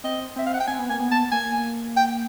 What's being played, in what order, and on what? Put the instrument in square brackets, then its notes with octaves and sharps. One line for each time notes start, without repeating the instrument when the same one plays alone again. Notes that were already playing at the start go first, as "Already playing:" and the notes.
[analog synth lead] C4 [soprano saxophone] D#5
[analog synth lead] C4 [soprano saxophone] E5
[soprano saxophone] F5
F#5
G5
[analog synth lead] C4 [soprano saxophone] G#5
[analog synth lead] B3
[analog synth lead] A#3 [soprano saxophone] G#5
[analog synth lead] B3
[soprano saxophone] A5
[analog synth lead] A#3 [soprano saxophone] G#5
[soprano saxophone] G5